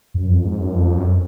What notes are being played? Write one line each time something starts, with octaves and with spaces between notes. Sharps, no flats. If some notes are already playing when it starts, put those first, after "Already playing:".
F#2
F2
G#2
F#2
F2
F#2